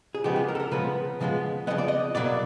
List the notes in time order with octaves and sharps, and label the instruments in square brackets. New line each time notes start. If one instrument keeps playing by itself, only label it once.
[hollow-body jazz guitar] G#4
C#3 F3 G#3 B3 G4
G#4
A#4
A4
A#4
C#3 F3 G#3 B3 B4
C#3 F3 G#3 B3
C#3 F3 G#3 B3 D#5
D5
D#5
B2 F#3 A#3 D5